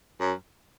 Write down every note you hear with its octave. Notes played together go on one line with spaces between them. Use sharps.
F#2